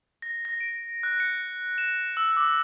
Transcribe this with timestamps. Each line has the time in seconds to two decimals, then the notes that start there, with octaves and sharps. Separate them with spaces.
0.22 A#6
0.45 A#6
0.60 D7
1.03 F#6
1.20 C#7
1.78 E7
2.17 E6
2.37 D6